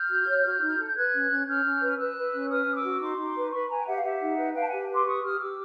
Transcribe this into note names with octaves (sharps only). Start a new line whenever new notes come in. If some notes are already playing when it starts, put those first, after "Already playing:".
Already playing: F6 G6
F#4
C#5
F#4
D#4
A4
G6
B4 F#6 G#6
C#4
C#4
C#4 F6 G6
C#4
B4
B4 E6 F#6
B4
C#4
B4 D#6 F6
C#4
D6 E6
F#4
D#4 C6 D6
D#4
B4
B4 B5 C#6
B4 G#5 A#5
G5
G4 E5 F#5
F5
G4 E5 F#5
D#4
B4
B4 F5 G5
A5
G4 F#5 G#5
B4 C6 D6
G4 C#6 D#6
G4 D#6 F6
G4 D6 E6